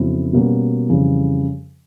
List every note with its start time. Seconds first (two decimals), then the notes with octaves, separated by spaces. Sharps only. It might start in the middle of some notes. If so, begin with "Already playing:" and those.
Already playing: F2 C#3 F#3 B3 E4
0.33 B2 G3 A#3 C#4 F#4
0.89 F2 C#3 E3 G3